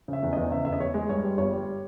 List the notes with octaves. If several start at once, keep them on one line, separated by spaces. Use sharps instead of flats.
C#3 E5
E2
E2 D#5
C#3 E5
E2 E5
D#5
E2 C#5
G#3
G2 C#5
G3
G1 C#5
G3